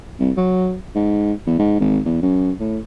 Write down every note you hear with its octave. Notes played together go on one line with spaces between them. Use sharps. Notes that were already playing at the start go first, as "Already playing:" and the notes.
C2
F#3
G#2
E2
G#2
G#1
E2
F#2
A2